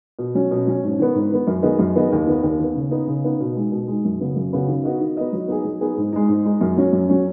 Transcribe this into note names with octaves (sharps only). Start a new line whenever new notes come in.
B2
F#3 C#4
B2
F#3 C#4
G#2
D#3 B3
G#2
D#3 B3
F#2
D#3 B3 G#4 D#5
F#2
D#3 B3 G#4 D#5
D#2
D#3 B3
D#2
D#3 B3
C#3
B3 D#4
C#3
B3 D#4
B2
G#3 D#4
B2
G#3 D#4
F#2
C#3 B3 F#4
F#2
C#3 B3 F#4
D#3
B3 D#4 F#4 D#5
D#3
B3 D#4 F#4 D#5
F#3
B3 D#4 G#4
F#3
B3 D#4 G#4
G#2
G#3 D#4
G#2
G#3 D#4
F#2
F#3 C#4
F#2
F#3 C#4